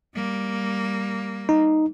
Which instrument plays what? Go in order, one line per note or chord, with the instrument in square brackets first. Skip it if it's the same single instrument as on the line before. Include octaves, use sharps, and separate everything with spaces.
[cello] G3 A#3
[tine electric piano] D#4